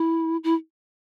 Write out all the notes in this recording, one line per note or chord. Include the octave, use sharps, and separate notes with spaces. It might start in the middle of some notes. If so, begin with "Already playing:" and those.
Already playing: E4
E4